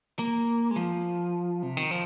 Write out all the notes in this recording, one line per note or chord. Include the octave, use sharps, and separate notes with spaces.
A#3
G#3
F3
C3
D#3
F3